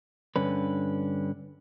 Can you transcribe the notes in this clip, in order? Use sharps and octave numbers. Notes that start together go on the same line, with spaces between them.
G2 D3 C#4 B4